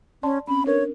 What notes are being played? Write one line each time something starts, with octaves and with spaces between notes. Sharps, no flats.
C#4 D5 A5 C6
C4 C#4 B5
D4 A#4 B4 C#5